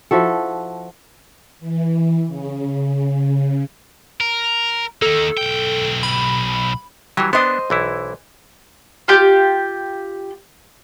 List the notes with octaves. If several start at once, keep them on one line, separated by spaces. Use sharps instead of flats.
F3 E4 F#4 A4
E3
C#3
A#4
D#3 A#3 A4
B1 G5
B5
E3 F#3 G3
B3 D4 C5 D#5
B1 E3 E4
F4 G4